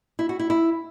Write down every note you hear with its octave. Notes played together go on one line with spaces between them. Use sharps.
E4
F#4
E4
E4